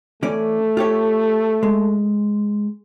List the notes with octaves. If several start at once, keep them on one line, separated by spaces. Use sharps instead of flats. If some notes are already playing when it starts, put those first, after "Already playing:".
E3 A3 C#4 D5
F4 G4 C#5
G#3